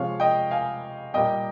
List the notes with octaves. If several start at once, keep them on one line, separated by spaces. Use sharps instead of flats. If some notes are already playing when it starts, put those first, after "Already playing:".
Already playing: C3 F3 G#3 C#5 F5
D#5 G5
F5 G#5
A#2 G3 A#3 D#5 G5